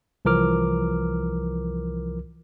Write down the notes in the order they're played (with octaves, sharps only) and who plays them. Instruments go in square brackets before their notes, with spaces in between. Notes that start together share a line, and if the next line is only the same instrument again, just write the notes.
[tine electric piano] C2 E3 F3 A#4 D6 F6